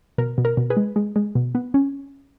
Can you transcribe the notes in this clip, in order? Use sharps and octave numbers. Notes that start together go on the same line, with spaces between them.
B2 A#4
B2
A#4
B2
G#4 B4
G#3
G#3
G#3
B2
B3
C#4